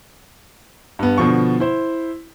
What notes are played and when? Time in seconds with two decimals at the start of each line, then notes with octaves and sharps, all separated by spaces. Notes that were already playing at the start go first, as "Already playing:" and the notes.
0.99 G2 B3
1.18 B2 D3 F3 C#6
1.60 E4 C5